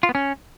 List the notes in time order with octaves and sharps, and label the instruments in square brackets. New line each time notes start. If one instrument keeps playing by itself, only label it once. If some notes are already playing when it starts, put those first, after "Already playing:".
[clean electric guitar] F4
B3
C#4